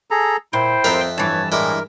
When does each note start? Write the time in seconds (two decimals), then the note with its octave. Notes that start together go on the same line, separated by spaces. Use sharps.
0.11 G#4 A4 A#5
0.53 A#2 E4 C5 G5 C6
0.84 F2 C4 A#4 E5 F5
1.18 G2 E3 C#5 A5
1.52 A2 G#3 E4 A#4 D5